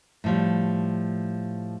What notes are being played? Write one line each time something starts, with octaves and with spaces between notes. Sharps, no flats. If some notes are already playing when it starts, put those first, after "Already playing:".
A2 F3 G3